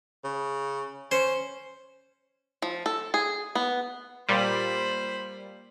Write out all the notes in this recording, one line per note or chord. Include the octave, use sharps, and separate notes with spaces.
C#3
C#4 C5
F3
A4
G#4
B3
A#2 G3 C5 B5